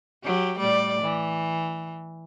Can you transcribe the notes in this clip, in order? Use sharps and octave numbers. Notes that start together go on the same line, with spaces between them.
F#3 G4
A2 G3 D5
E3